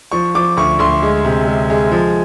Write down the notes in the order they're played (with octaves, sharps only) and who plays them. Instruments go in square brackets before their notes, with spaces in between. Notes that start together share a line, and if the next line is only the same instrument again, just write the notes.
[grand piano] F3 C#6
F3 D6
D2 C#6
D2 C6
G#3
C3
G#3
G#3
F3